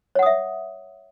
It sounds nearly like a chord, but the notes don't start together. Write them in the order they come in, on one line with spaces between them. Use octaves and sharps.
C#5 F#5 D#6 E5